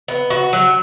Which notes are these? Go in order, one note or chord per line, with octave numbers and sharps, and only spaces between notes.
B3
F#4
F#3